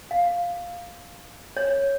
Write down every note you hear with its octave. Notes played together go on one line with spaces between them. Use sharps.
F5
C#5